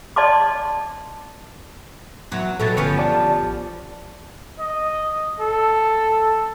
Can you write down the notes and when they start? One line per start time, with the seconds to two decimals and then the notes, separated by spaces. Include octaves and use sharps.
0.16 D5 D#5 A5 C6 D6
2.31 E2 F#3
2.60 B2 F#3 G3 A4 A6
2.77 G1 D3 F3 B3 C#4 C#7
2.99 G4 D5 A5
3.43 A1
4.59 D#5
5.40 A4